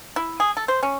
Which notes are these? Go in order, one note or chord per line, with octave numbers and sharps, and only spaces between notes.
E4
G#4
A4
C5
C#4